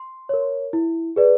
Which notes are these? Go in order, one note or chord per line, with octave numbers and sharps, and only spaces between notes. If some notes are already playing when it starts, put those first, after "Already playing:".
Already playing: C6
A#4 C#5
E4
G#4 B4 D5